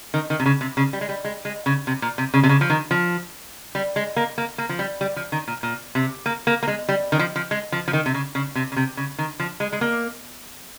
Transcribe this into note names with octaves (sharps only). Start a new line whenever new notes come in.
D#3
D#3
C3
C#3
C3
C#3
G3
G#3
G3
G#3
G#3
C#3
C3
A#2
C3
C#3
C3
C#3
F3
D#3
F3
G3
G#3
A#3
A#3
A#3
F3
G3
G3
F3
D#3
A#2
A#2
C3
A#3
A#3
A#3
G#3
G3
D#3
F3
F3
G#3
F3
F3
D#3
C3
C#3
C#3
C3
C#3
C3
C#3
D#3
F3
G#3
G#3
A#3